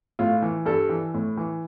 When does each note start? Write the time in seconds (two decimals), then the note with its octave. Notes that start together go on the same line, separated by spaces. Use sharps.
0.19 A2 F4
0.42 E3
0.66 G2 A4
0.89 E3
1.14 A2
1.37 E3